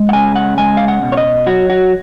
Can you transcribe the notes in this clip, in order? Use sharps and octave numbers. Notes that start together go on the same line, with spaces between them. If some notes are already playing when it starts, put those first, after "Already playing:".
Already playing: G#3
F#5
C#3 G#5
F#5
G#3 G#5
F5
F#5
B2
C#5
D#5
F#3 F#4
F#4